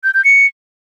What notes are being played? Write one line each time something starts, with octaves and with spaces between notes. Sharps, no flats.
G6
G6
C#7